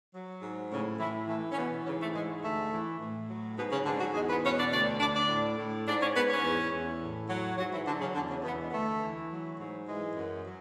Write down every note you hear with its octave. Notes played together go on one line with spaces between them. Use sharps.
F#3
G#2
A2 C#3 C#4
A2 E3 E4
E3 A3
C#4
B2 E3 B3
G#2 C#3 C#4
A3
G#2 G#3
D2 A3
E3
A2
F#3
G#2 B2 B3
C#3 C#4
G#2 D3 D4
F#3 F#4
E2 G#3 G#4
B3 B4
B2 C#4 C#5
D4 D5
D2 D4 D5
D2 D4 D5
D4 D5
A2
A2
G#2 D4 D5
C#4 C#5
G#2 B3 B4
C#4 C#5
E2
E2
A2
F#3
G#2 F#3 F#4
E3 E4
D3 F#3 D4
C#3 C#4
E2 D3 D4
C#3 C#4
E2 B2 B3
G#3
B3
D2 A3
E3
F#3
G#2
E3 G#3
F#2
F#3